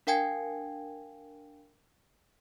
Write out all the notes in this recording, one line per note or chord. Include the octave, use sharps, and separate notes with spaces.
D4 A#4 F5 G5 G#5 G#6